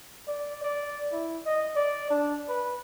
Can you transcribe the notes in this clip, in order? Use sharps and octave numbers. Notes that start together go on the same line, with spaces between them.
D5
D5
E4
D#5
D5
D4
B4